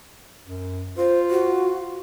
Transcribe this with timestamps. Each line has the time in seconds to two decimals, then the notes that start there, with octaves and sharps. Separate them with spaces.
0.44 F#2
0.97 F4 C5
1.30 F#4